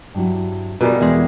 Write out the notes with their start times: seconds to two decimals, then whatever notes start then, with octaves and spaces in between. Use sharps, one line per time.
0.15 G2 F#3 E4
0.81 B2 D#3 G3 F4 G#4
1.01 E2 G#3